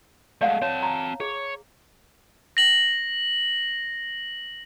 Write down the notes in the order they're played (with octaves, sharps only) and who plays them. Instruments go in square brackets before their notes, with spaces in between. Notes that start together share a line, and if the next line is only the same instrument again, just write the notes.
[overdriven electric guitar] G#3 A3 [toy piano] D5 F5 F#5
[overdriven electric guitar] C4 A5 [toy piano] C#5
[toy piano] A#5
[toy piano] G#4 [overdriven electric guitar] C#5
[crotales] A#6 F#7